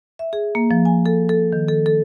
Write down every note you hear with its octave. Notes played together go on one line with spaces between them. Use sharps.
E5
G#4
A#3
F3
G#5
A4
A4
D#3
A4
A4